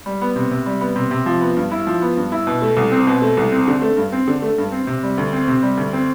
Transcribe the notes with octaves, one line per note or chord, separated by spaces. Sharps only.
G3
B3
C3
C3
G3
B3
C3
C3
F3
B3
G2
E4
F3
B3
G2
E4
B2
A3
C2
C4
B2
A3
C2
C4
D3
A3
G2
C4
D3
A3
G2
C4
C3
G3
D2
C4
C3
G3
D2
C4